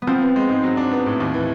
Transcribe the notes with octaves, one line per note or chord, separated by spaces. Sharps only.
B3
F3 C4
B3
G#3
G#2
F#3
D4
B3
A2
D#2
E3